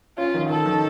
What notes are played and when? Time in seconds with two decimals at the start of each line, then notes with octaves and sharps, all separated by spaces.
0.18 C#4 F4
0.34 D#3
0.50 D#3 A4
0.66 D#3